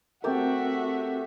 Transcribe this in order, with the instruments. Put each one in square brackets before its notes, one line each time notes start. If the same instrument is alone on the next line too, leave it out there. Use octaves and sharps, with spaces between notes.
[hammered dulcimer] A3 G4 A4 [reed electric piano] C4 A#4 [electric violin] F#4 E5